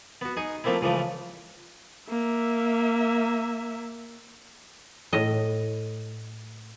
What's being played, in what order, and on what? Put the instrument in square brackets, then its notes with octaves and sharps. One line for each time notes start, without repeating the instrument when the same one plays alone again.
[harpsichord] B3 F#4
D#4 G#4 C#6
F3 A3 A#3 C4 E4
C#2 C#3 E3 F3 A3
[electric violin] A#3 E5
[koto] A2 D#5